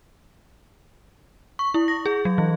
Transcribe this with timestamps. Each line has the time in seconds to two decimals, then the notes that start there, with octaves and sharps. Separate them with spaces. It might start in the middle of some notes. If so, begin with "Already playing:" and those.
1.59 C#6
1.74 E4
1.88 A#6
2.06 G#4
2.25 F#3
2.38 E3